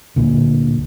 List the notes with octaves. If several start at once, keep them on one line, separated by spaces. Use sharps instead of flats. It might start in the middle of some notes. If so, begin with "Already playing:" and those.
D1 A#2 D3